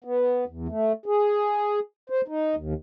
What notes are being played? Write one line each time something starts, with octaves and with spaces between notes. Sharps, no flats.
B3
E2
A3
G#4
C5
D#4
D#2